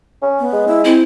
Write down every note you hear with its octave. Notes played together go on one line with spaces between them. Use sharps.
C#4
B3
G#3
E4
C4 E4